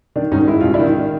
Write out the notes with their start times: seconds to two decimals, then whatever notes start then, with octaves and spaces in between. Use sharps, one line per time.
0.16 D#3 D4
0.32 G#2 C#4 D#4
0.47 G#3 E4
0.61 A1 F4
0.74 D4 E4
0.80 D#3